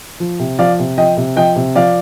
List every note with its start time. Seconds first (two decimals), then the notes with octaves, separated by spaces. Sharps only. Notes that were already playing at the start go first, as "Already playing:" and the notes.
0.20 F3
0.39 C3
0.59 F3 D5 F5
0.79 C3
0.98 F3 D#5 G5
1.17 C3
1.36 F3 D#5 G5
1.56 C3
1.76 F3 D5 F5